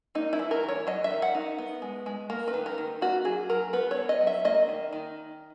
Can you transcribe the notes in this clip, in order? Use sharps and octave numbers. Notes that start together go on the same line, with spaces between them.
A#3 D#4
E4
E3
A#4
E3
C#5
F#3 D#5
E5
D#3
F#5
D#4
B3
G#3
G#3
A#3 A#4
B4
D#3
A#4
D#3
A#3 F#4
F#3 G#4
F#3 A#4
B3 B4
C#5
F#3
D#5
F#3
E5
A#3 D#5
D#3
D#3